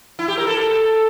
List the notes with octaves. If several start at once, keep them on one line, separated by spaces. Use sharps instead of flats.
E4
G4
A#4
A4